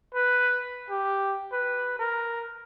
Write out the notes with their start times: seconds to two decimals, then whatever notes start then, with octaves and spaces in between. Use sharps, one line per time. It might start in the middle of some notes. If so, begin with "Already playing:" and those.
0.14 B4
0.90 G4
1.52 B4
1.99 A#4